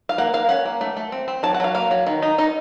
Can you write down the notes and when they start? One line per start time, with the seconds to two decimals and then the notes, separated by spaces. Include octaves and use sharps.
0.09 F5
0.18 A#3 F#5
0.34 A#3 F5
0.49 C#4 F#5
0.65 A#3
0.81 A3
0.97 A3
1.12 C4
1.28 C4
1.43 F#3 A5
1.54 F#5
1.60 F#3 F5
1.75 A#3 F5
1.91 F#3
2.06 D#3
2.22 D#4
2.38 D#4 D#5